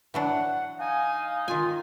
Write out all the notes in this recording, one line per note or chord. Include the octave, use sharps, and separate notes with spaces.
E3 F#3 D4 F#5
D#4 F5 G#5
D#3 F4 G#5